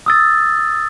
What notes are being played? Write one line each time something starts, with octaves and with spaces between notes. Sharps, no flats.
D#6 E6 A6